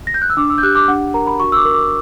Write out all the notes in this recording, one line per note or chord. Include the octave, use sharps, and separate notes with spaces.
A#6
G6
F#6
E6
D4 D6
E6
G6
G4 F#6
D6
D4 F#5
A#4 A#5
B5
F#4 C#6
E6
D6
A#4
D6